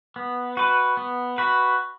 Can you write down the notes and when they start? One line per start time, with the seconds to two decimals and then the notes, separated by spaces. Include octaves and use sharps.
0.16 B3
0.57 F#4 B4
0.97 B3
1.38 F#4 B4